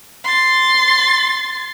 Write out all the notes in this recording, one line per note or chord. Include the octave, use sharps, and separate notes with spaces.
C6 A6